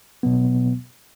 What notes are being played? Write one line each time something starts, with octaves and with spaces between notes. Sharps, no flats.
B2 F#3 B3